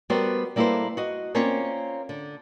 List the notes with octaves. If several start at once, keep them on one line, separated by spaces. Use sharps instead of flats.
G3 B3 F#4 A#4 C5
G3 A#3 E4 A4 B4 C5
F#4 D#5
A#3 C4 C#4 F4 C#5 D5
D3